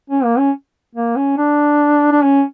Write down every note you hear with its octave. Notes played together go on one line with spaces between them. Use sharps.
C#4
A#3
C#4
A#3
C#4
D4
D4
C#4